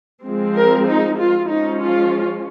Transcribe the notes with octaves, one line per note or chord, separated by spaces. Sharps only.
F3 G#3 C4
A#4
D#4
F4
F3 G#3 C#4 D#4
F4